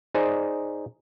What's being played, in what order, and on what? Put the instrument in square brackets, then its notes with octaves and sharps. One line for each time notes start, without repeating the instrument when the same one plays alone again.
[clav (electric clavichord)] D#4 G#4 C5 D5